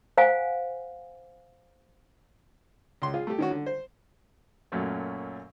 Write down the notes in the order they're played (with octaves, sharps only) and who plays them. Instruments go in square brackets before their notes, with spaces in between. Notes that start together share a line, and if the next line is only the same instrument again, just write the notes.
[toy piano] C5 F5 F#5 G#5
[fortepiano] C#2 C6
F4 G#4
A3 G4
D#3 C#4 F#4
D3
C5
F#2 A#2 F#3 A3 C#4